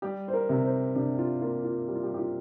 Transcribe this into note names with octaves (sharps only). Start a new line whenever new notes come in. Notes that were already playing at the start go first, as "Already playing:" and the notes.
G3 G4
C5
A#4
C3
C5
C3 D4
F4
A#3 F4
F4
G3 G4
F4
G4
G4
F4